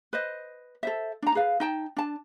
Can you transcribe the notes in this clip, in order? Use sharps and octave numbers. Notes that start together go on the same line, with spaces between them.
B4 C5 D#5
A4 C5 E5
D4 A#5
G#4 B4 F5
D#4 G5 A5
D4 A5